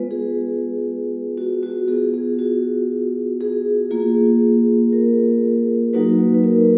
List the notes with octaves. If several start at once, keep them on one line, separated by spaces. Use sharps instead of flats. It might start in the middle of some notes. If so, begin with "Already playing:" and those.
Already playing: G#3 B3 F4 B4
G#4
F#4
F#4
B3 F4 G#4
G#4
F#4
G#4
A#3 F4 G#4
A#4
F#3 A#3 D#4 F#4 B4
B4
A#4